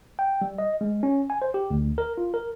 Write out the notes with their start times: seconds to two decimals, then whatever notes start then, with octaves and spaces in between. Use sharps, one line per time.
0.19 G5
0.41 G3
0.58 D#5
0.81 G#3
1.03 C#4
1.30 G#5
1.42 C5
1.54 G4
1.70 D2
1.98 A#4
2.18 F4
2.34 A#4